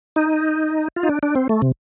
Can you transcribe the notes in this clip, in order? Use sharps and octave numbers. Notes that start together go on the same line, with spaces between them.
D#4
F4
D#4
D4
D4
C4
A3
C3